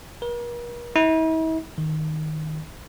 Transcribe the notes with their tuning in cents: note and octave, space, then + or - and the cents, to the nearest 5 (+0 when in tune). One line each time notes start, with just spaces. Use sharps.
A#4 +45
E4 -45
D#3 +0